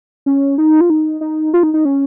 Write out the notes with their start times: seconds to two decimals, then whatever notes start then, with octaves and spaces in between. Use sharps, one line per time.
0.26 C#4
0.58 D#4
0.81 F4
0.90 D#4
1.21 D#4
1.54 F4
1.63 D#4
1.74 D#4
1.85 C#4